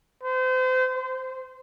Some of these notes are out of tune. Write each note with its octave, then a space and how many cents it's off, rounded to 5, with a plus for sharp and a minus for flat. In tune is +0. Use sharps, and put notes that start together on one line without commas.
C5 -35
C5 -10